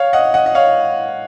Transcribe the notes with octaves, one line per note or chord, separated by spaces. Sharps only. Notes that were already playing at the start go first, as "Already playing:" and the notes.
Already playing: C#5 F5
D#5 F#5
D#5 F#5
D#5
C#5 F5